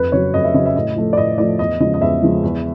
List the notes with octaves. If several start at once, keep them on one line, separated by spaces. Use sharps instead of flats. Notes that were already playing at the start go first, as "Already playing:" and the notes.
Already playing: F2 B4
C#3 F#3 C#5
F2 D#5
E5
C#3 F#3 D#5
E5
A2 D#5
F3 A3
D5
A2 D#5
F3 A3 D5
E2 D#5
C#3 F3 G#3 D#5
D#5
E2 E5
C#3 F3 G#3
E2